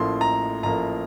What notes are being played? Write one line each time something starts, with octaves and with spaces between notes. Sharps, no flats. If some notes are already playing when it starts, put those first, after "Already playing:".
Already playing: A1 A2 F3 A#3 C6
A#5
A1 A2 F3 A#3 A#5